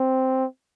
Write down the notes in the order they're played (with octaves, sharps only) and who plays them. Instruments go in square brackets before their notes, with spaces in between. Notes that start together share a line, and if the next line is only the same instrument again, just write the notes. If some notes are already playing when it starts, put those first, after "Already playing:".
Already playing: [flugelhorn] C4